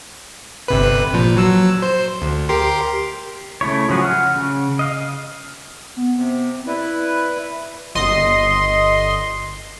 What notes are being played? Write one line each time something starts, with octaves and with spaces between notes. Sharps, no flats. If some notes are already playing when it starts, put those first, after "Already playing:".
G1 C3 B4
A#2 F3
F#3 E6
C5
D2
G4 A#4 C6
C#3 A3 E4 C#5
F3 F#3 C#4 F#4 G#4
F#5 F6
C#3
D#5 F5
B3
C3
E4 B4 D5
G1 D#5 C6